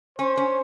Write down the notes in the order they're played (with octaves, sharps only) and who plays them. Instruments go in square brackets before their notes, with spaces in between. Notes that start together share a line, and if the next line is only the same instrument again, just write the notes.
[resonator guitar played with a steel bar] C#4 [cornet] C5
[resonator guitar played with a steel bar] C#4